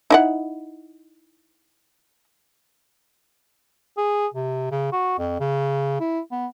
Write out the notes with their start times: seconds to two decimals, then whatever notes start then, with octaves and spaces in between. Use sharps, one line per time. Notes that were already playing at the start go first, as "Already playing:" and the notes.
0.10 D#4 E4 F#5
3.97 G#4
4.34 C3
4.71 C#3
4.92 F#4
5.18 F2
5.40 C#3
6.00 E4
6.31 B3